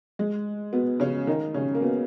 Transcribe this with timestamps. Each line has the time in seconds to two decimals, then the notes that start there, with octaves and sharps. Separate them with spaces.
0.19 G#3
0.73 B2 B3
1.00 C#3 C#4
1.27 D#3 D#4
1.54 C#3 C#4
1.75 A#3
1.82 B2 B3